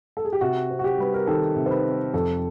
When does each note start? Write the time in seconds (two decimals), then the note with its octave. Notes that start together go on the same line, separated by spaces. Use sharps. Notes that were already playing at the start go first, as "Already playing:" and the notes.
0.17 A4
0.25 G#4
0.33 G4
0.41 C3 F#4
0.70 C4
0.79 F#4
0.84 G4
0.98 G3 B4
1.14 A#4
1.27 D#3 A4
1.56 C3
1.66 C5
1.71 B4
1.85 C4
2.14 F2 A4